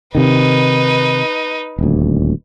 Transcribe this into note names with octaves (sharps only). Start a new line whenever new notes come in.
C3 D#3 D#4 B4
D#1 D2